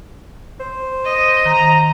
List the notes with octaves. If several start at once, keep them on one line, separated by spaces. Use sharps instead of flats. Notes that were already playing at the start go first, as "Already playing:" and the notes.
C5
D#5
D#3 A#5